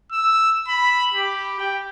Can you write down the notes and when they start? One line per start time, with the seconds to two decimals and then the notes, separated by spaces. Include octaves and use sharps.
0.12 E6
0.68 B5
1.14 G4
1.60 G5